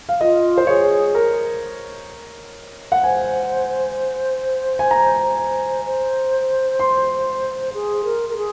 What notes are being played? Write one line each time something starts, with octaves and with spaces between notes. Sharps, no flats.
F5
F4 D#5
C5
G#4 C#5
A#4
F#5
C5 G#5
G#5
A#5
C5
C6
G#4
A#4
A#4
G#4